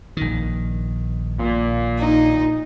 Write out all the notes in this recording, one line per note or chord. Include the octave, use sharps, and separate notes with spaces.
A#1 D#3
A#2
D#4